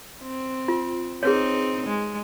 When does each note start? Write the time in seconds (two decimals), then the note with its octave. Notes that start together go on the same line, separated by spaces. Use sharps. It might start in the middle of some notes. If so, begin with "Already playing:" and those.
0.22 C4
0.68 F4
1.23 C4 D#4 G#4 B4 C#5
1.87 G#3